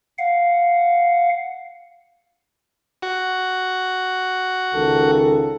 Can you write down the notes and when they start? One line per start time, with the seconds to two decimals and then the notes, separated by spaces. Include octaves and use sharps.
0.18 F5 F#5
3.02 F#4
4.74 C#2 D#3 A4